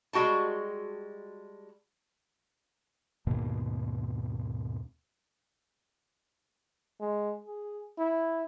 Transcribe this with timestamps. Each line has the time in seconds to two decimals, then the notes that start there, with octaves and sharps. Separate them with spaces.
0.13 G3 G#3 F#4 G5 A5
3.27 D#2 G#2 B2 A#3
7.01 G#3
7.45 G#4
7.99 E4